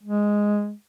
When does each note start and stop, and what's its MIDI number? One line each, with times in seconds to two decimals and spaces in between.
0.03 0.73 56